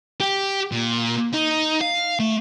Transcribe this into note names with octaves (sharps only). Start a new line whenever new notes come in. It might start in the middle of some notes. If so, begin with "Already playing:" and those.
G4
A#2
D#4
F5
A3